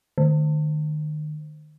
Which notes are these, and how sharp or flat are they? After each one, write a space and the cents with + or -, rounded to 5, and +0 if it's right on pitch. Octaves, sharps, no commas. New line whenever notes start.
D#3 -35